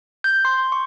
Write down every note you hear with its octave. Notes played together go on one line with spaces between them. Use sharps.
G6
C6
C#6